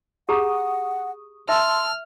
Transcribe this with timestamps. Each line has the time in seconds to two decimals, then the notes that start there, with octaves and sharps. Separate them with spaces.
0.29 G4 G#4 F#5 A#5 C#6 D#6
1.49 E5 A5 C6 E6 F6